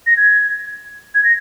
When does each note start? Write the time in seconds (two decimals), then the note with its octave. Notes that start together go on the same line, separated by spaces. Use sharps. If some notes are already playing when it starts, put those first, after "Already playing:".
0.07 A#6
0.17 G#6
1.15 G#6
1.24 A#6